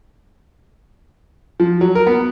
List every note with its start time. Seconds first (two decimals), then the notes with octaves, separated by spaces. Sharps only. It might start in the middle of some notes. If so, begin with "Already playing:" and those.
1.60 F3
1.81 F#3
1.95 A#4
2.07 B3